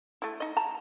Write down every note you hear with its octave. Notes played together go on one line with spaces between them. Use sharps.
A3 E4
D#4 D#5
A5 A#5